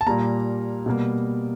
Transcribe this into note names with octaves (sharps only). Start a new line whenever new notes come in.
A5
A#2 G3 A#3 A#5
B2 G3 A#3